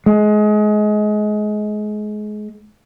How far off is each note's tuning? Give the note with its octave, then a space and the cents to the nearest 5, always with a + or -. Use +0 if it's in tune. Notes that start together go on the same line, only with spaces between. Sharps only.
G#3 +25